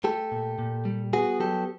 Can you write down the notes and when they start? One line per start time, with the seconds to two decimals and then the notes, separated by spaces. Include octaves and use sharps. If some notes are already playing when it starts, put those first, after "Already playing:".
0.04 A3 G4 A4
0.32 A#2
0.59 A#2
0.85 G3
1.13 B3 F#4 G#4
1.40 F#3 G4 A4